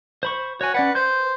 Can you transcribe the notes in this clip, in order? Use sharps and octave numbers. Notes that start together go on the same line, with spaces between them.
C5 B5 C#6
F#4 C#5 G#5
C#4 B4 D5 F#5
B4 C5 G6